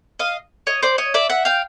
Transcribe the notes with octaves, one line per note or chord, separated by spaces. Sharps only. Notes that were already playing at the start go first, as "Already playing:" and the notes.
D#5 F5
C#5 D#5
C5 D5
C#5 D#5
D5 E5
E5 F#5
F5 G5